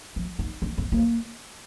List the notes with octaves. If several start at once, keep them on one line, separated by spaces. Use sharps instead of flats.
F3
D#4
D4
C4
A#3